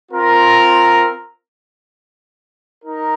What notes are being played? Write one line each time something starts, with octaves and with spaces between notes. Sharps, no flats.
C4 F4 A#4
D#4 A#4